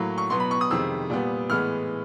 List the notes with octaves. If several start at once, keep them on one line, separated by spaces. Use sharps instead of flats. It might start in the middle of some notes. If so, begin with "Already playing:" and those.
Already playing: A2 F#3 A#3
C#6
B2 F#3 B3 C6
B5
C#6
D#6
F2 C3 D#3 G#3 E6
A#2 G3 B3
A2 E3 G#3 B3 F6